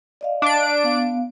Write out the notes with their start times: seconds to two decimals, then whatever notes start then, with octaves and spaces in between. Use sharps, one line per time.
0.21 D5 D#5 F5
0.42 D4 D7
0.84 B3 F5